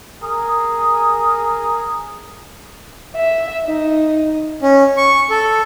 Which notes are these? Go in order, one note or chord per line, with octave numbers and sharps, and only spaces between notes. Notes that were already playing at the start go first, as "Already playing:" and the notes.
G#4 A#4 D#6
E5
D#4
C#4
C#6
A4